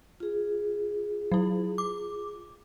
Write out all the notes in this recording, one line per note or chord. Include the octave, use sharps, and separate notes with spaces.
F4 G#4
F#3 E4
D6